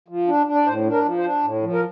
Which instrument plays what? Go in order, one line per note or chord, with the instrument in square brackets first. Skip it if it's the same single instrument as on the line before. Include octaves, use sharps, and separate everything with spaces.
[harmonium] F3
D4
D4
D5
A2 C5
D4
A#4
F3
C5
D4
A2
F3
A#4